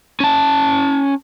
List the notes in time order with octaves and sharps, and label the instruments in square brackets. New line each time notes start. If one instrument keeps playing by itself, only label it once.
[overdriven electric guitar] C#4 A5